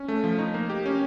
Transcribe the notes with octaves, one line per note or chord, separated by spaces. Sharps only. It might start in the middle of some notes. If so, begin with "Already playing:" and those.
Already playing: C#4
A3
F3
D#4
A#3
G4
C#4